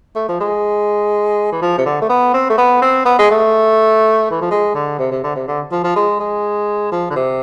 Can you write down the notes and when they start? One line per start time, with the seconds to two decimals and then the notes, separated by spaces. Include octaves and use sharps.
0.16 A3
0.29 F3
0.40 G#3
1.52 E3
1.62 F3
1.78 C3
1.86 D3
2.02 A3
2.09 B3
2.34 C4
2.50 A3
2.58 B3
2.82 C4
3.05 B3
3.19 G#3
3.31 A3
4.31 E3
4.41 F3
4.51 G#3
4.75 D3
4.99 C3
5.12 C3
5.24 D3
5.36 C3
5.48 D3
5.72 F3
5.84 F3
5.96 G#3
6.20 G#3
6.92 F3
7.10 D3
7.16 C3